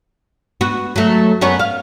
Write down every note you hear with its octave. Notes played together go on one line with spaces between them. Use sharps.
B3 F#4
F#3 A3
F#2 B3 C#5
F5